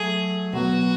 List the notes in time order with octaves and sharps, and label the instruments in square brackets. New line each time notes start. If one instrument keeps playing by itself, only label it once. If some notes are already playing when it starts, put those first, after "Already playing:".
Already playing: [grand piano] F#3 A3 [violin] G#4
[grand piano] B2 F#3 B3 [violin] F#4